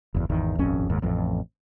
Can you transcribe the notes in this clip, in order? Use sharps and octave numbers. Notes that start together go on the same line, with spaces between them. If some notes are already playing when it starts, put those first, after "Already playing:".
F#1 E2
G#1 E2 D#3
D#1 G#1 F2 C#4
F1 D#2 G#2
A1 F2